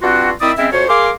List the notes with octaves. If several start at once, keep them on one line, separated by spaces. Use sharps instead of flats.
G2 C4 F4 F#4
D#3 C4 E4 D5 E5 D#6
G#3 C4 C#4 E4 E5
F2 F#4 C5 C#5
G#4 A#4 F5 C6 D6